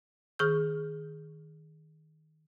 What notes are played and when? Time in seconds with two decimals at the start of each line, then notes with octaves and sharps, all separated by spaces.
0.39 D#3 G#4 C#6 F6 G6